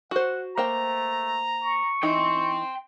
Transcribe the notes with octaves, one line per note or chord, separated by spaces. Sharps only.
F#4 C5 F#5
A3 A#3 C5 G5 A#5
C#6
E3 D#4 G5 C6